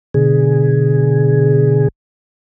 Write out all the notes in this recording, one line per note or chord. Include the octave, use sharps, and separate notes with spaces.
B2 D3 G#4